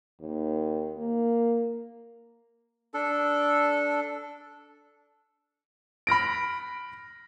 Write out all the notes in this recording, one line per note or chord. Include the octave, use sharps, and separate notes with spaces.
D#2
A#3
D4 A4
B5 F6 A#6 D7